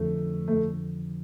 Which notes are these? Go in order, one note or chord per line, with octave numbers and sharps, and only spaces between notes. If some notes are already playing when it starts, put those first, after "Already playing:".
Already playing: F2 D3 F3 A3
A3